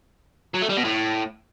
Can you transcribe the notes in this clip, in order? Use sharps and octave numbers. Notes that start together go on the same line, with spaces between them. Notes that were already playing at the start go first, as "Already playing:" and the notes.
F#3
A3
G3
B2
A2